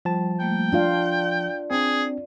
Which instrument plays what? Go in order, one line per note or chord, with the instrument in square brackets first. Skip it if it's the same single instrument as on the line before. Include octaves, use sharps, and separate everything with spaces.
[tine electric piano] F3 A5 [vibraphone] G3
[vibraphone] G3 A3 A#3 [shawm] G5
[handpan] D4 F4 F5 [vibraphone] D5
[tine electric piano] C4 D4 [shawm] G#4